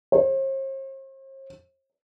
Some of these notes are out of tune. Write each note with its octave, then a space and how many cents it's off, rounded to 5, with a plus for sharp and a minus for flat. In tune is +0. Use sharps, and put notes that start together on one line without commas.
C5 +45